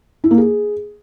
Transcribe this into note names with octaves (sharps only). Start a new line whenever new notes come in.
E4
A#3
G#4